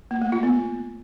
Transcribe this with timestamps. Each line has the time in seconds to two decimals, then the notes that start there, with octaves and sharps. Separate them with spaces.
0.11 A#3
0.22 A3
0.32 F4
0.43 B3